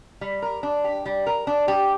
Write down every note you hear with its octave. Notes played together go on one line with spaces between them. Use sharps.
G3
A#4
D4
G4
G3
A#4
D4
G4